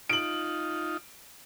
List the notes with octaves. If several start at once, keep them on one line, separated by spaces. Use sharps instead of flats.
D#4 F4 D7 F#7